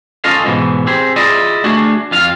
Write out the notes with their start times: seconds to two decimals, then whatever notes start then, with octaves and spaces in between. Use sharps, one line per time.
0.24 C#4 F4 A4 D#5 F5
0.46 G#2 B2 E3
0.87 C4 G4 G#4
1.16 E4 F4 G#4 D5 D#5
1.64 A3 D4 F#4 G#4
2.11 F2 F4 F5